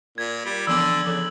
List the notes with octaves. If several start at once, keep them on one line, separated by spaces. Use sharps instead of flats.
A#2 G#6
G3
D3 E3 F3 B3 E6 F#7
C#3 F3 A4